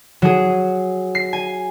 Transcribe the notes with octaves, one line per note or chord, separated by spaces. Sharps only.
F#3 G#4
C7
G#5